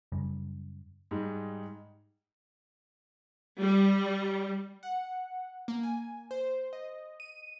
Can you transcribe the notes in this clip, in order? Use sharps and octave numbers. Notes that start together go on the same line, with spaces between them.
F#2 C#3 G3
G#2 G3 G#3 D#4
G3
F#5
A#3
G#5
C5
D#5
D#7